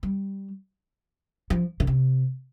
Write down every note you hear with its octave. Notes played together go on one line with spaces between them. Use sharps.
G3
F3
D3
C3